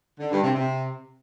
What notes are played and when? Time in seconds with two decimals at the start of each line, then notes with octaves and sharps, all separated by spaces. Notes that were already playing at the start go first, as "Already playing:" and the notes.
0.20 D3
0.31 G2
0.43 C3
0.55 C3